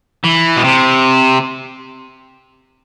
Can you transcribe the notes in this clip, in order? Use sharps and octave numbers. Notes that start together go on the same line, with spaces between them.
E3
B2
C3